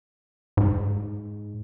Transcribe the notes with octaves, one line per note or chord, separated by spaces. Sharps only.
G#2